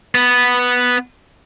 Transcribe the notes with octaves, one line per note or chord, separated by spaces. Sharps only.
B3